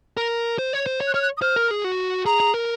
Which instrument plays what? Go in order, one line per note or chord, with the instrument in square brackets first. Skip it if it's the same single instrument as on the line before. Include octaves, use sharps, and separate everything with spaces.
[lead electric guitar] A#4
C5
C#5
C5
C#5
[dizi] F#6
[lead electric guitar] C#5 [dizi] F6
[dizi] F#6
D#6
[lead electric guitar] C5 [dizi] F6
[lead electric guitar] A#4
G#4
F#4
[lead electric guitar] G#4 [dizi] A#5
[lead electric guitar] G#4
A#4